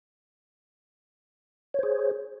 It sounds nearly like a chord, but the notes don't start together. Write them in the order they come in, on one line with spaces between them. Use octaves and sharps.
C#5 C5 G#4